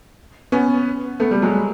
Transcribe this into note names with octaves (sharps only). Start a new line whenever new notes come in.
B3 C#4
A3 B3
G3 A3
F#3 G#3